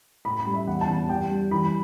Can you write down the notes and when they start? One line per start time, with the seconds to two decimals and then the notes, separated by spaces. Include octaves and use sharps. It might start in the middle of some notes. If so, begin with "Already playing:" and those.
0.25 A2 B5
0.40 B5
0.46 G3
0.54 E5
0.67 E2 F#5
0.81 A5
0.88 E2
1.09 G3 G5
1.30 G3
1.51 E3 B5